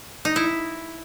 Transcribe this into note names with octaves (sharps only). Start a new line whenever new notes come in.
D#4
E4